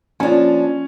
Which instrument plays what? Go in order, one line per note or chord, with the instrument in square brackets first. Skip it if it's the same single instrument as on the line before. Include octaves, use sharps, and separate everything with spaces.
[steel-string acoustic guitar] F3 D4 [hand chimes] A#3 F4 [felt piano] C#4 G#5